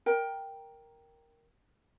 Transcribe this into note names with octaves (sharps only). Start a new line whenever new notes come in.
A#4 G5